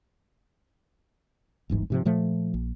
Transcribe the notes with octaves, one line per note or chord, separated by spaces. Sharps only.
D1 G1 G#2 E3
G#2 C3 F3
A#2 F3 A3
A#1